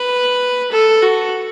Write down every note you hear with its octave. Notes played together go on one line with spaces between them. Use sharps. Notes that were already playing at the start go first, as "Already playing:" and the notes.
Already playing: B4
A4
F#4